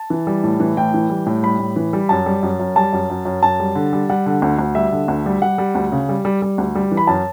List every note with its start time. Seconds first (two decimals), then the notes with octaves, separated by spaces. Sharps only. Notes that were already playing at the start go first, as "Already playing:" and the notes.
Already playing: A5
0.10 E3
0.27 G3
0.44 A2
0.60 E3
0.77 A2 G5
0.94 E3
1.10 G3
1.26 A2
1.43 G3 B5
1.59 A2
1.76 E3
1.93 G3
2.09 F#2 A5
2.26 G3
2.43 F#2
2.60 F#2
2.76 G3 A5
2.93 F#2
3.10 F#2
3.25 F#2
3.42 F#2 A5
3.60 G3
3.75 D3
3.93 G3
4.09 G3 F#5
4.26 D3
4.42 D2
4.59 D2
4.75 G3 E5
4.92 D3
5.08 D2
5.26 G3
5.42 G3 F#5
5.58 G3
5.75 D2
5.92 C#3
6.09 G3
6.25 G3
6.42 G3
6.58 D2
6.75 G3
6.92 E3
6.97 B5
7.07 F#2 A5